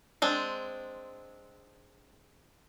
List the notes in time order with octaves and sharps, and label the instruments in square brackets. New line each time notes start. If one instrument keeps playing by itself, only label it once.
[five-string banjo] G#3 C4 D4